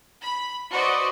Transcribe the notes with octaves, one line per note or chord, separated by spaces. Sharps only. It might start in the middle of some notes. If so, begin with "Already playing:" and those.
B5
F#4 B4 C5 D5 D#5